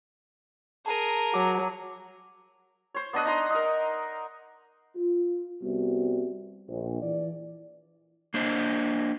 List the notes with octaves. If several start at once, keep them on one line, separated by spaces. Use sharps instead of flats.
G#4 A#4 A5 A#5 D#7
F#3 D6
C5 C#5
B3 D4 D#5 F#5
D#4 A#5 C6 D#6
D#4 A#4
F4
C2 G3 B3 F#4
A#1
E3 D5
A#3 D4 C5 D#5